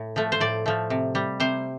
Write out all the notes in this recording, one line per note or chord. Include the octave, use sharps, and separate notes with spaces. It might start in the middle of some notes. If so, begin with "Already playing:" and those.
Already playing: A2
F3 A3
C5
A2 D5
F3 A3
C3
G3
C3 C5